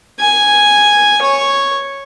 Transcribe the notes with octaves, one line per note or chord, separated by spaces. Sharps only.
G#5
C#5